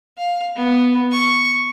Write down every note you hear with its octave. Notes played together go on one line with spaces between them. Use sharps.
F5
B3
C#6